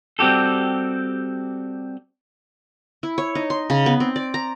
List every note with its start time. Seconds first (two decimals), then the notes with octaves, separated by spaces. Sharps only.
0.19 G3 C4 F#4 G4 A4
3.03 E4
3.18 C#5
3.35 D#4
3.50 C6
3.70 C#3
3.86 B3
4.00 C4
4.16 D5
4.34 A#5